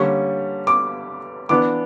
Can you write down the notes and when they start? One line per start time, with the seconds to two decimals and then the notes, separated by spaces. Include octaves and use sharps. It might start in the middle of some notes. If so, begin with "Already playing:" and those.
Already playing: D3 G3 A#3 C#4 C#6
0.67 D6
1.49 E3 B3 D4 D6